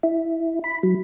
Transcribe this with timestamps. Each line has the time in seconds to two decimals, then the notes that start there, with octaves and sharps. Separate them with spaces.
0.03 E4
0.64 B5
0.83 F#3